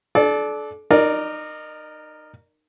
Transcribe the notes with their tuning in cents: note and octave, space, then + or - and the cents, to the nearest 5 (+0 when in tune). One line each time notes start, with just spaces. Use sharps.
D4 +0 A4 -35 D5 +0
D#4 -25 A#4 +0 D5 +0